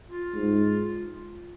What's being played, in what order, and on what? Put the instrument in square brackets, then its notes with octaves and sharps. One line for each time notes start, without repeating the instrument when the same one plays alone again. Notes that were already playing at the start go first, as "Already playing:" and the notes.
[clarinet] F4
[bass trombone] G#2